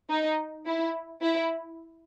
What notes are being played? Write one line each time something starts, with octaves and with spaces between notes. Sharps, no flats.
D#4
E4
E4